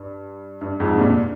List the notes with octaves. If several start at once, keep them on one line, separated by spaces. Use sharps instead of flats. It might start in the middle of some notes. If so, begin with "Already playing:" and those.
Already playing: G2
G2
F2 G#2
C3
G2 A#2